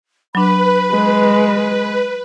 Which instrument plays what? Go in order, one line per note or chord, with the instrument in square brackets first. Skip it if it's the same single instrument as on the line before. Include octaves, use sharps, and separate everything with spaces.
[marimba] F#3 D4 [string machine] B4 [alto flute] B5
[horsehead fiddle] G#3